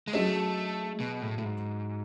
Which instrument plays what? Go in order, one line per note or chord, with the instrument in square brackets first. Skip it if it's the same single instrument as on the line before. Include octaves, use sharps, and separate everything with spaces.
[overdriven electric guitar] G#3
[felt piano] F#3 C#4 G#4 D#5 [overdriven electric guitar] A3
[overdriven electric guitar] B2
A2
A2
G#2